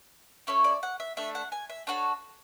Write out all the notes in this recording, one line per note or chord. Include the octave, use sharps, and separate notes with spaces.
C#4 E4 A4 C#5
D5
F#5
E5
A3 D4 A4 E5
F#5
G#5
E5
D4 F#4 A4 C#5